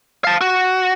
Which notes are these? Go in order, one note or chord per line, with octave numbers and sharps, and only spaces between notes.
F5 A5
F#4